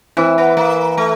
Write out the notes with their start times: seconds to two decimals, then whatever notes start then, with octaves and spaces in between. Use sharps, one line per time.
0.17 E3 C4
0.38 B3
0.57 A#3
0.97 A3